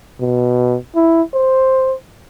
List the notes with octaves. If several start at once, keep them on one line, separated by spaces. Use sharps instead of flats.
B2
E4
C5